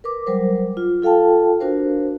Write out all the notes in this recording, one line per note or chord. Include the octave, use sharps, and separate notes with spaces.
A#4 B4 D6
F#3 G3 A#4 C5
F4
F4 A4 F5 G5 A5
D4 F#4 A#4 C5